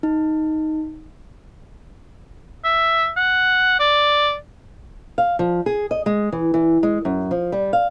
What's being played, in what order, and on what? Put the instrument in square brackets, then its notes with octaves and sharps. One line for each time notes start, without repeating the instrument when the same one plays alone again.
[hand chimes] D#4
[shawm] E5
F#5
D5
[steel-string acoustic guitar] F5
F3
G#4
D#5
G#3
E3
E3
G#3
F#2
F3
G3
F5